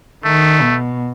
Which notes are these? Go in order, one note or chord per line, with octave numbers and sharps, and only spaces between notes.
D#3 A3
B2